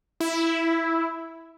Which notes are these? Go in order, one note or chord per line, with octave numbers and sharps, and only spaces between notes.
E4